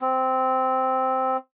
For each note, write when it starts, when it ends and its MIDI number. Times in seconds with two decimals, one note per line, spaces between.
0.01 1.37 60